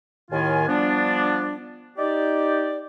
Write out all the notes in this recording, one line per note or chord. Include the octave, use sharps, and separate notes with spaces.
D#2 A2 D#3 F4 G#5
F3 G3 B3 D4
D#4 G4 D5